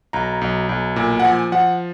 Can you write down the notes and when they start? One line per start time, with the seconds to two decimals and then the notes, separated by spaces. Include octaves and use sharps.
0.13 B1 A#5
0.41 B1
0.69 B1
0.96 A#2
1.20 F#5
1.24 F3 G#5
1.52 F3 F#5